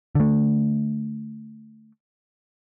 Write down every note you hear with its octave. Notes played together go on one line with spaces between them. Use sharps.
D3 A3